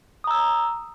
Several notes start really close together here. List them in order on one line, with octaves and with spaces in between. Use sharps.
D#6 A#5 E6